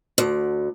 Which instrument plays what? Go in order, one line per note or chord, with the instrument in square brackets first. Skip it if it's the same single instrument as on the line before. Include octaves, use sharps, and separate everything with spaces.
[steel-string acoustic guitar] D2